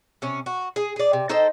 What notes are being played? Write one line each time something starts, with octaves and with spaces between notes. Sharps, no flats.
C3 C#4
F#4
G#4
G#4 D5
C3
D#4 A4 C5 G5